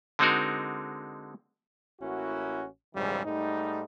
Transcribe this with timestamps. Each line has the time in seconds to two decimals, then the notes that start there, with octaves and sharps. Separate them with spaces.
0.19 D3 G#3 C4 D#4 F#4 A#4
2.01 A1 A#3 C#4 E4 F#4
2.95 A#1 F2 G#2 C#3 E3 G3
3.25 G#2 G3 A3 D#4